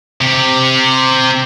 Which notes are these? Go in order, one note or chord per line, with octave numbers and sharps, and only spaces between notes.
C3 G4